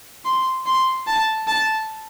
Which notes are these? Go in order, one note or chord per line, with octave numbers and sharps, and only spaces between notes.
C6
C6
A5
A5